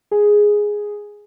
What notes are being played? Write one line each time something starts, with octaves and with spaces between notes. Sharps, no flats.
G#4